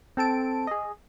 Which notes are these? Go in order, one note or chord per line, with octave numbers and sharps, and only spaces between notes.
C4 A4 A5 D7
G#4 D#5